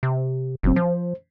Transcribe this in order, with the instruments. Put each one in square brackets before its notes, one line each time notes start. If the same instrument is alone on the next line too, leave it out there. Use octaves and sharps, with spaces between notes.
[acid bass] C3
[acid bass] F#1 [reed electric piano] A#2 F#3 C4
[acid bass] F3 [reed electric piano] C5